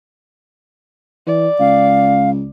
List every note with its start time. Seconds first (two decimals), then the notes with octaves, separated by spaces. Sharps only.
1.27 E3 D5
1.59 C#2 F5